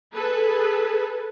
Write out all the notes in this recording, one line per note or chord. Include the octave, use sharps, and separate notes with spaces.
G#4 A4 B4